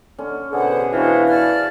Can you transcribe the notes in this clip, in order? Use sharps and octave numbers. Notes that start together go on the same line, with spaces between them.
D3 C#4
A1 B2 D3 G#4 B4 C5 F#5
E3 D4 F#4 C5 F5 G5
D5 A5 F6